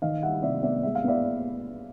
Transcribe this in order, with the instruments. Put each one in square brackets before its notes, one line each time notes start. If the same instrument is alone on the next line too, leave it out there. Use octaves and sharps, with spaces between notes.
[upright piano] D#3 D#5 F5
G3 E5 F#5
C3 D5 E5
B3 D5 E5
G#3 E5
F5
B3 D5 E5